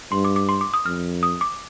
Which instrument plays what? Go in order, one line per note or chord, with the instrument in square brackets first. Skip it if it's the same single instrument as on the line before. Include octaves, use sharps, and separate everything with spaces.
[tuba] G2 [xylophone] C6
[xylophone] D6
D6
C6
D6
D#6
[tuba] F2 [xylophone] F6
[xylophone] D#6
D6